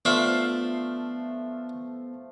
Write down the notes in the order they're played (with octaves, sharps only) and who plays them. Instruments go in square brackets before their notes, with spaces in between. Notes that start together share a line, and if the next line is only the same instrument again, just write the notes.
[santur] F3 A3 F5 [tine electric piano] B3 [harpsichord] D4 E5